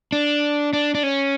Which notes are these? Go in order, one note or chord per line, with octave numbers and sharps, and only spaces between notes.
D4
D4
D4
C#4